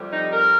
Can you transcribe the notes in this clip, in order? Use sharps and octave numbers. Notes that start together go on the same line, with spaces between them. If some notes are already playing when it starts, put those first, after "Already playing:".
Already playing: F2 C3 G3
D#4
A#4